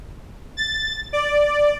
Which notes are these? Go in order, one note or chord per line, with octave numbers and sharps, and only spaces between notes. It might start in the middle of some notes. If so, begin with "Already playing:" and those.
A6
D5